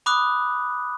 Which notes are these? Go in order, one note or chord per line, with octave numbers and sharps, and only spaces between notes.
B5 D6 D#6 F#6